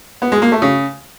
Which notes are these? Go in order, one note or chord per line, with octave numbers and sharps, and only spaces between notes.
B3
G#3
A#3
A3
C#3